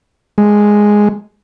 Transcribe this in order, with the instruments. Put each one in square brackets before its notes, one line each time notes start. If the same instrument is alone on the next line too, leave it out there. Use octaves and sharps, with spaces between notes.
[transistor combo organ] G#3